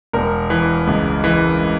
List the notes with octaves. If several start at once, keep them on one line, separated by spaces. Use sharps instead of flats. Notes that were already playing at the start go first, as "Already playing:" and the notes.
E1 A#4
E3
C#2
E3